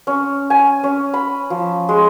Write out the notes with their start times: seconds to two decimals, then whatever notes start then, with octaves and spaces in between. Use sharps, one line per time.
0.07 C#4
0.50 G#5
0.84 C#4
1.14 B5
1.50 F3
1.89 G#3